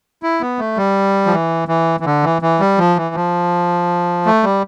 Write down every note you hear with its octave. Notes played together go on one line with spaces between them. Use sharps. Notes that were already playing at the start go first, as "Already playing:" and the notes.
E4
B3
A3
G3
F3
E3
E3
E3
D3
E3
E3
G3
F3
E3
F3
A3
G3